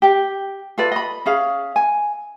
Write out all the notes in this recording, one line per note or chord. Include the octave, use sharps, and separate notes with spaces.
G4 G5
F4 A4 B4 D5
D#5 B5
C#4 G#4 F5
G#5